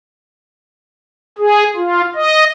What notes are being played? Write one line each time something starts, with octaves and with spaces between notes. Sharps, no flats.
G#4
F4
D#5